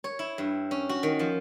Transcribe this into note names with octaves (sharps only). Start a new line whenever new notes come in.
C#5
E4
G2
C#4
F#4
D#3
F3